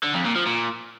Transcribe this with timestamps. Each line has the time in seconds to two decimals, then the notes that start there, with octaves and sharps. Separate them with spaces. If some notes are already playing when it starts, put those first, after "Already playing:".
0.03 D3
0.14 F2
0.25 A#2
0.36 F3
0.47 A#2